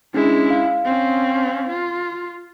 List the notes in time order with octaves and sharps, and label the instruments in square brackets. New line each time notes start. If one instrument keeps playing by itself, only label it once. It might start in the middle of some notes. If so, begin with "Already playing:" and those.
[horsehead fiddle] G#3 E4 [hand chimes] C#4 D4 G#4
[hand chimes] F5
[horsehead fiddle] C4 C#4
F4